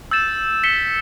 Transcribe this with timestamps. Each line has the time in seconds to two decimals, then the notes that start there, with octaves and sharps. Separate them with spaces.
0.11 E6 G6 A6 E7
0.64 B6 C#7 E7 G7